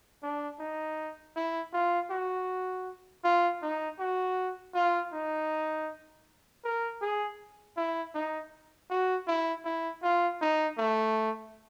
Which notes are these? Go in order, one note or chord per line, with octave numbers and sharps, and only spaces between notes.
D4
D#4
E4
F4
F#4
F4
D#4
F#4
F4
D#4
A#4
G#4
E4
D#4
F#4
E4
E4
F4
D#4
A3